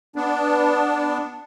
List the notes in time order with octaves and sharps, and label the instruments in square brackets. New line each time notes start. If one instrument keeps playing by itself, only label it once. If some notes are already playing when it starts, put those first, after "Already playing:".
[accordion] B3 D4